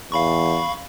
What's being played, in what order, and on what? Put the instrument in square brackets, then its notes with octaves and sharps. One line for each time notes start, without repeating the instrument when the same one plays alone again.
[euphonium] E2 [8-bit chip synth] F5 B5 C#6